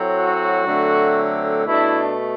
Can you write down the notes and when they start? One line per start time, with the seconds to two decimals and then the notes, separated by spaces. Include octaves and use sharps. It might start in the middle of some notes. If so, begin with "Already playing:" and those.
Already playing: A2 F#3 C4
0.14 F#4
0.64 D3 F#3 A3 C4
1.65 B2 A3 D4 E4